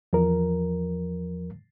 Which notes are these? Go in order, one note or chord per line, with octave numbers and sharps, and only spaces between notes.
E2 F3 A#4